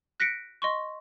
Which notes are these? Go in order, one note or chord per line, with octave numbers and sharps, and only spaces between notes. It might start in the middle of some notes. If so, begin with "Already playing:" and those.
F#6 A#6 B6 C#7 D7
D#5 C6 C#6